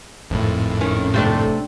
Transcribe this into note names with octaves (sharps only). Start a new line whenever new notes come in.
G#1 F2 A2
D#3 C#4
C3 A3 D4